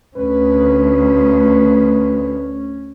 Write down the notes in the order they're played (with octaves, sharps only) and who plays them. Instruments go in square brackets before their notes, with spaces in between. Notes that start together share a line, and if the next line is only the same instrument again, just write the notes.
[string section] D2 [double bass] C#4 [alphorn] B4